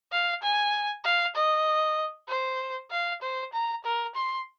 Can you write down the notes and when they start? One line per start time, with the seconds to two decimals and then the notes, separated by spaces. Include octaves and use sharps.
0.12 F5
0.42 G#5
1.04 F5
1.35 D#5
2.28 C5
2.91 F5
3.22 C5
3.53 A#5
3.84 A#4
4.15 C6